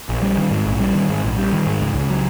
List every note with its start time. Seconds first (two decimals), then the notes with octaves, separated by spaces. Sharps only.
0.09 A#1
0.22 G3
0.37 D#3
0.51 G#2
0.66 A#1
0.80 G3
0.95 D#3
1.10 G#2
1.23 A#1
1.38 G3
1.53 D#3
1.67 G#2
1.81 C#2
1.95 C#2
2.10 F#3